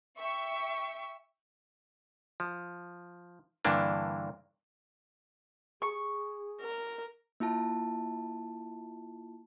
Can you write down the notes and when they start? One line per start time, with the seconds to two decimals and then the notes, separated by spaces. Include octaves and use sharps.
0.17 E5 G5 C#6
2.40 F3
3.65 G2 D3 E3 A#3 D4
5.82 G#4 C#6
6.61 A#4
7.40 A#3 E4 F4 A5